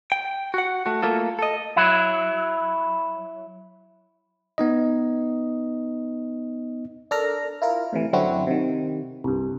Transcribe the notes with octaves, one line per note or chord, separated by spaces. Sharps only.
G5
F#4 F#5
A3 F#4
A3 A#3 F4 A4
A4 D#5
F#3 E4
B3 D#4 D#5
D4 A4 A#4 A#5
E4 F4 A#4
A2 C3 E3
F#2 D3 F#3 C4 E4 F#4
C3 D#3
C2 G2